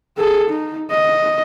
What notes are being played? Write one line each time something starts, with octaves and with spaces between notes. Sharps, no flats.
G#4 A4
D#4
D#5